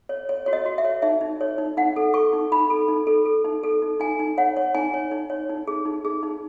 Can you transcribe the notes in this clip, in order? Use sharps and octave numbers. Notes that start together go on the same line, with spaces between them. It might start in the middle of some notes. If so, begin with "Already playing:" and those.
C#5
C#5
F#4 C#5
D#5
F#4
E5
C#5
D#4 E5
D#4
C#5
D#4
D#4 F#5
A4
A4 C#6
D#4
D#4 B5
A4
D#4
A4
A4
D#4
A4
D#4
D#4 G#5
D#4
C#5 F#5
C#5
D#4 G#5
C#5
D#4
C#5
D#4
G#4
D#4
G#4
D#4